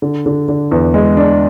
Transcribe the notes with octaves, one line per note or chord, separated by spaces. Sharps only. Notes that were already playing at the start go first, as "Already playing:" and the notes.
D3
D3
D3
E2
G#3
D4